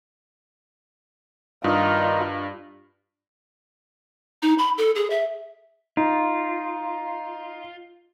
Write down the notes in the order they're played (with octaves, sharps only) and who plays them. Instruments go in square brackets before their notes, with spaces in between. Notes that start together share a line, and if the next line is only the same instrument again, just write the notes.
[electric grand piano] G2 [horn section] D#3 D#4 [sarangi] F4
[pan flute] D#4
B5
A4
G#4
E5
[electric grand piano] D#4 [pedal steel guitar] F4